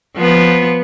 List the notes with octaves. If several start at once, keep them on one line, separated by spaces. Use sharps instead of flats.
F3 B3